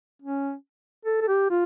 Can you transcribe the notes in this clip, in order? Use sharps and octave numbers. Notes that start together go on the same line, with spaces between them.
C#4
A4
A4
G4
F4